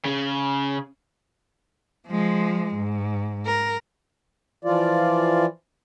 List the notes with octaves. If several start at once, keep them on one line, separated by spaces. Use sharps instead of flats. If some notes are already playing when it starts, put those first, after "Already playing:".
C#3
F3 G#3
G#2
A#4
E3 F3 F4 D5